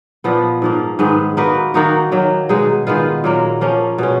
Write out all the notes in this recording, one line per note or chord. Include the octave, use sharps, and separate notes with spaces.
A#2 F3 B3
G#2 F3 A#3
G#2 D#3 G#3 B3
A#3 D#4 F#4 B4
D#3 A#3 D#4 F#4
D#3 F#3 A#3
B2 G#3 D#4 G#4
D#3 G#3 B3 F4
A#2 F#3 A#3
F3 A#3 C#4
B2 G#3 C#4